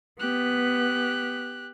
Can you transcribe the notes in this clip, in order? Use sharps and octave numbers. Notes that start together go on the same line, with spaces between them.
B3 G4 F#6